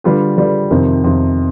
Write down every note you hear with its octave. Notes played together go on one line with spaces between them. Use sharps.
D3 G3 D4 F4 B4
D3 G3 D4 F4 B4
F2 C3 D#3
F2 C3 D#3